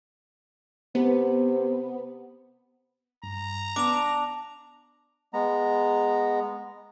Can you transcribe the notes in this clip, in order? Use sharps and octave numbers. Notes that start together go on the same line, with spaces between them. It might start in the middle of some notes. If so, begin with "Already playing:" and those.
C3 B3
G2 A#5
B3 D4 F#5 D6 F7
G#3 B3 A#5